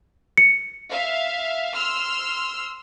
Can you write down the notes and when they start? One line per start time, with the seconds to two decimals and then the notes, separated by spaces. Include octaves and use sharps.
0.38 C#7
0.89 E5 F5
1.75 C6 E6 F6